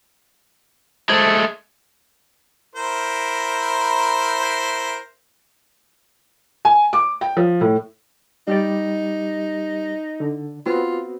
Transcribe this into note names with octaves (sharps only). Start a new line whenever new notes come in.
G#3 A3 C5 G#6
E4 A#4 C5
G#5
D6
G5
F3
A2
G3 D#4 G4 D5
D3
B3 C4 F4 F#4